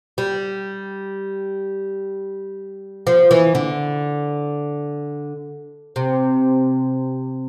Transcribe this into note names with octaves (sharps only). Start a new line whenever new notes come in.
G3
F3
E3
D3
C3